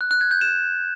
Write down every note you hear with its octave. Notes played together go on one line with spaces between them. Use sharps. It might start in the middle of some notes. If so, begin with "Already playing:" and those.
F#6
F#6
G#6
G6
E7